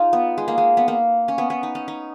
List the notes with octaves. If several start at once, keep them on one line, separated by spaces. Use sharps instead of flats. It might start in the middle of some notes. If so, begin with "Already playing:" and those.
Already playing: D#4 F4 G#4
B3
G#3
A#3
G#3
B3
A#3
C#4
B3
B3
D#4
C#4
D#4